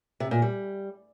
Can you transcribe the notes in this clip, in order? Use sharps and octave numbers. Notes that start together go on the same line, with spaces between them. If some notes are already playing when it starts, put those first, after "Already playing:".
C3
A#2
G3